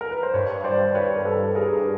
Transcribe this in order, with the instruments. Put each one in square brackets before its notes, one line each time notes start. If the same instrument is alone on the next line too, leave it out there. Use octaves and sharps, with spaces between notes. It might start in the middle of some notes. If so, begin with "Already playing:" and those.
[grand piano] A#4
B4
C5
[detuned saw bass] G2 [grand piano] B4 C#5
[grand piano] C5 D5
B4 C#5
A#4
A4 B4
G#4 A#4